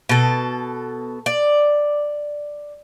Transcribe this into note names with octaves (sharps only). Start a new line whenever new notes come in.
B2 A4
D5